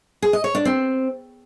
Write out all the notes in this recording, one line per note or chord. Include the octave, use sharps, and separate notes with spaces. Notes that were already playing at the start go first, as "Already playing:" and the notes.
G#4
D#5
C#5
D4
C4